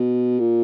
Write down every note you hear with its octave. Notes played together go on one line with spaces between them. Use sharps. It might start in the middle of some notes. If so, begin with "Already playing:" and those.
Already playing: B2
A#2